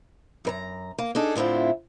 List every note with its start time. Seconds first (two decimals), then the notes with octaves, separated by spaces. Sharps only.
0.45 F#2 A#4 A#5
0.98 A#3
1.15 D4 D#4 G#4 A4
1.35 A2 D3 C4 E4 F4